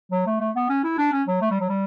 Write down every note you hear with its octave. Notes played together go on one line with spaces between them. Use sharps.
F#3
A3
A3
B3
C#4
E4
D4
C#4
F#3
A3
G3
F#3
G3